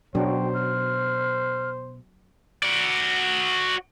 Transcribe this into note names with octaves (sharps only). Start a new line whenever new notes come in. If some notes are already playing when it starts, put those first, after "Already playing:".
B2 F#3 D4 C5 G5
F6
F#4 D5